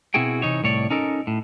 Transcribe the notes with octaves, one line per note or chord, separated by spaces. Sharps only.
B2 C4 E4 F#4 G#4 G5
C3 E3 D#4 C#5
C2 A2 C#5 D5
C#4 D#4 A4 A#4
A2